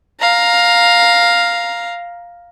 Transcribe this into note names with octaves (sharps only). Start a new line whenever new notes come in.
F5 A#5